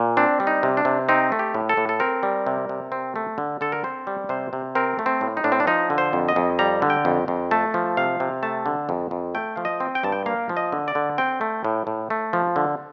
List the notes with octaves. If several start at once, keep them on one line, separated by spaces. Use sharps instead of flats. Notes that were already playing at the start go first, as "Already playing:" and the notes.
Already playing: A#2
C4 D4
G3
D#4
C3
D4
C3
C4 D#4
A3
G4
A2
A4
A2
A4
C4 A#4
G3
C3
C3
C4
A3
D3
D3 A4
A#4
C4 C5
G3
C3 C5
C3
C4 A#4
A3
C4
A2
D#4
A2 D4
C4
D4
F3 D#4
D3
C5
F2
D#5
F2
G3 A#5
D3
G5
F2
F2
A3 A5
F3
C3 F5
C3
A3 A5
D3
F2
F2
A3 G5
F3 F5
D#5
C4
G5
G2 A5
G5
A#3 F5
F3
D#5
D3
D5
D3
C4 G5
A3
A2
A2
A3
F3
D3